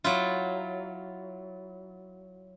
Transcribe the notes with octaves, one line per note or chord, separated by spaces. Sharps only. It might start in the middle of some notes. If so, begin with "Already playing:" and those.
F#3 E4 F4